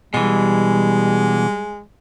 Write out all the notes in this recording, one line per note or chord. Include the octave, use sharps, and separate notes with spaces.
B2 E3 G3 G#3